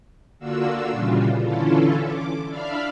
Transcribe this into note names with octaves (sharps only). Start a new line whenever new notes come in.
D3 A#3 D4 F4 F#4 E6
A#2 C#3 E3 G3 F4
D3 E3 C#4 E4 F4 A4
D6
D4 D5 E5 F5 B5 F6